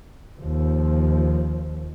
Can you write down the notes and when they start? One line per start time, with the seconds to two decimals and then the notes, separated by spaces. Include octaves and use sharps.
0.40 D#2 F3